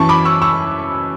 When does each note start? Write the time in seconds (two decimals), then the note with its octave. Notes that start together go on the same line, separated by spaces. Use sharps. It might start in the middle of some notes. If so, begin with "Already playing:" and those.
Already playing: F#2 E3 A5 C#6
0.09 B5 D6
0.25 C#6 E6
0.42 C#6 E6